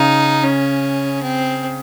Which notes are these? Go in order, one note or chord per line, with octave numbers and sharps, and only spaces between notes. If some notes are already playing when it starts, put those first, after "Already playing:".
Already playing: C#3 D#4
C#4
C4